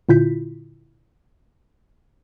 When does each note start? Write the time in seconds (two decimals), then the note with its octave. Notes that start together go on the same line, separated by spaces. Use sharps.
0.09 A#2 D3 E4 F4 G6 B6